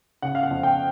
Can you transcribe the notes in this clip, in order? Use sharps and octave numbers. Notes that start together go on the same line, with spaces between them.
C#3 F#5
F5
F#5
F2
G5